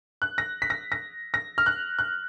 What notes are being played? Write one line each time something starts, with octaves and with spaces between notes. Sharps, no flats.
F#6
A#6
B6
A#6
A#6
A#6
F6
F#6
F#6